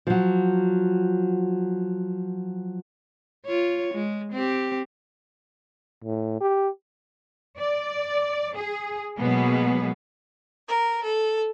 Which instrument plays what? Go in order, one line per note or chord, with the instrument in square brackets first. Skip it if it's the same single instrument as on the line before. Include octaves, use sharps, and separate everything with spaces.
[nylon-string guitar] F3 F#3
[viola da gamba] F4 C#5
G#3
C4 G4
[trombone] A2
G4
[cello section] D5
G#4
B2 F#3 G#3 A#3 B3 G#4
[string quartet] A#4
A4